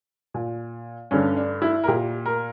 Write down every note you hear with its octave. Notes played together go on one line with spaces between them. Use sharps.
A#2
G2 D3 C#4
D4
E4
A#4
A#2 G4
A#4